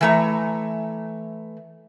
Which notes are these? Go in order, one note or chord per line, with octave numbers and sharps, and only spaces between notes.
E3 A3 A#5